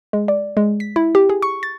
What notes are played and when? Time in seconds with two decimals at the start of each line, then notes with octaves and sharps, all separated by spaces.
0.13 G#3
0.28 D5
0.57 G#3
0.80 B6
0.96 E4
1.15 G4
1.30 G#4
1.42 C#6
1.63 A6